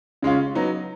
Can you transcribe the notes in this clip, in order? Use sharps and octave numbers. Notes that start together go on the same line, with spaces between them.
C#3 G#3 C#4 F4
F#3 B3 D#4